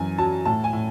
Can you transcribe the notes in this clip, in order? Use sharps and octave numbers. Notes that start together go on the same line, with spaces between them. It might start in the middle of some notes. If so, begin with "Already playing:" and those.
Already playing: F#2 E3 G#5
F#3 A5
A2 A5
G#5
A2